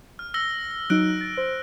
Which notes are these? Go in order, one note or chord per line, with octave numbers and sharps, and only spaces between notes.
F6
E6 A#6 G7
F#3 D#4 E6 F#6 D7
A6
C5